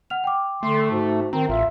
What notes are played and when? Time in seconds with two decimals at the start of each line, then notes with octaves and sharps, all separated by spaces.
0.10 F#5 F6 F7
0.24 G5 D6
0.63 D3 A3 C6
0.91 G#2 F#4
1.33 D#3 C4 A#5
1.49 A1 F4 E5